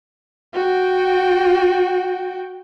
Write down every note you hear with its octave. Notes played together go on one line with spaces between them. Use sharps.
F#4 G5